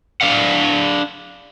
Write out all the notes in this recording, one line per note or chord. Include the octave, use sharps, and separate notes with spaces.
D4 D5 F5 F#5